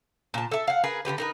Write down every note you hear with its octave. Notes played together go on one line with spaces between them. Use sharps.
A#2 A5
A4 E5
F5 F#5
G#4 A#4 B4
D3 C#4 G4 B4
D#4 A#4 B4